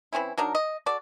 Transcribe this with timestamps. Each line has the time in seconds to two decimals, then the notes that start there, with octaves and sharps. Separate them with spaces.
0.13 E3 C4 C#4 E4
0.38 F#3 D4 D#4 A#4
0.55 D#5
0.86 F#4 A4 D5